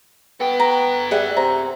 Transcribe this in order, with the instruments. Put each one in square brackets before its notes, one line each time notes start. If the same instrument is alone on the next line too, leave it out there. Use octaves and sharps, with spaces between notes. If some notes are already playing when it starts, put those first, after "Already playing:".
[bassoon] B3 [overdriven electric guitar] A4 G5
[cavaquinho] A#5
[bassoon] G3 [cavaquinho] G#4 E5 F#5
[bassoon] C3 [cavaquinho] A#5